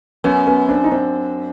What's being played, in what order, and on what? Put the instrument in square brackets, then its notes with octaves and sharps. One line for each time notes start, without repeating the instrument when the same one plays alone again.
[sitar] F#2 [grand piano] B3 C#4
[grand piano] B3 C#4
C4 D4
D#4
C4 D4